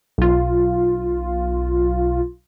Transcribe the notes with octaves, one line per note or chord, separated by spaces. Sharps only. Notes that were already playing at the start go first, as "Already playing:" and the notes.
B1 F4